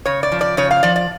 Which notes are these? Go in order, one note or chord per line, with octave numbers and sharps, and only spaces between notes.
C#3 C#5
D5
F3
D5
C#3 C#5
F5
F3 D5
D5